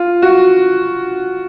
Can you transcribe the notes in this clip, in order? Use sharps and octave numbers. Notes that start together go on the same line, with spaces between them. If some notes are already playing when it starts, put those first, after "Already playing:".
Already playing: F4
F#4